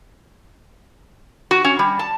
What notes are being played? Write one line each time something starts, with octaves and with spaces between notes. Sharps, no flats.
F#4
C#4
G3
A5